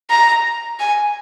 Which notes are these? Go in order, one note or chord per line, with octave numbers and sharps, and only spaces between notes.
A#5
G#5